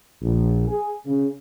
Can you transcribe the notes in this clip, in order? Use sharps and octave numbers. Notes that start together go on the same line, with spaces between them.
A#1
G#4
C#3